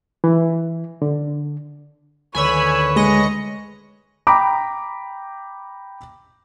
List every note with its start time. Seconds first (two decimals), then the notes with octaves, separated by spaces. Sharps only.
0.24 E3
1.02 D3
2.35 D2 D#3 B4 C#5 G#5 B5 E6
2.96 G#3 D#5 A#6 C#7
4.27 G5 A#5 B5 D6